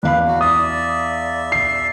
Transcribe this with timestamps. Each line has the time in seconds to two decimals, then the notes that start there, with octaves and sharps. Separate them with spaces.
0.03 E2 B4 F5 B5
0.27 F#4
0.41 D5 E5 D#6
1.52 C7